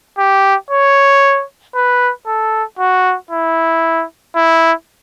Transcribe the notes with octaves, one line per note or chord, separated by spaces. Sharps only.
G4
C#5
B4
A4
F#4
E4
E4